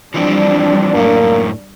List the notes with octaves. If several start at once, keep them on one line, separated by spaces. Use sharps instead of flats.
E3 F3 G3 C4 D4
F#2 A2 A#3